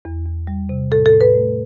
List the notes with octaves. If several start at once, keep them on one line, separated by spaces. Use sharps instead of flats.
E2
E2
G3
C3
A2 A4
A4
A2
B4
A3